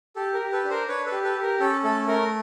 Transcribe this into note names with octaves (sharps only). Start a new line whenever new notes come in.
G4 A4
A#4
G4
A4 B4
D4
A#4 C5
D4 B4 C#5
A4 B4
G4
A4 B4
G4
A#4
C#4 A4
A3 A4
A3 A#4